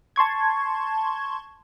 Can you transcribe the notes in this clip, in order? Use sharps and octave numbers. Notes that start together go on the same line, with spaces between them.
A5 C6 C#6 G#6